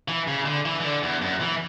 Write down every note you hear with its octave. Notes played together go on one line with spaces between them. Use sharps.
E3
C#3
D3
E3
E3
D3
E2
F#2
E3